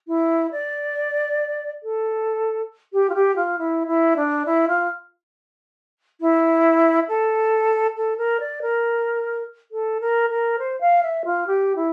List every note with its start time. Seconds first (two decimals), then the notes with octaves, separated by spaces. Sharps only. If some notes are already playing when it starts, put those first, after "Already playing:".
0.07 E4
0.51 D5
1.83 A4
2.92 G4
3.09 F4
3.14 G4
3.36 F4
3.58 E4
3.87 E4
4.16 D4
4.45 E4
4.67 F4
6.20 E4
7.08 A4
7.96 A4
8.17 A#4
8.39 D5
8.61 A#4
9.71 A4
10.00 A#4
10.29 A#4
10.58 C5
10.80 F5
11.02 E5
11.24 F4
11.46 G4
11.75 E4